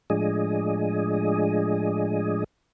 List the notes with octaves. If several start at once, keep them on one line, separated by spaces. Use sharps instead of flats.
A2 F3 G#3 D4 G#4 D#5